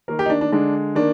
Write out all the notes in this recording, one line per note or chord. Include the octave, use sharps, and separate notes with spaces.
D#3 A#3 A#4
G4
D#4
D4
D4
D3 G#3 D4
D#3 A#3 D4